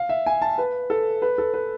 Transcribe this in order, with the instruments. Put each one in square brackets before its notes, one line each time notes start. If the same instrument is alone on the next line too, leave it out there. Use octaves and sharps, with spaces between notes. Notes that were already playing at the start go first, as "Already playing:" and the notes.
Already playing: [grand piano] F5
E5
G#5
A5
B4
A4
B4
A4
B4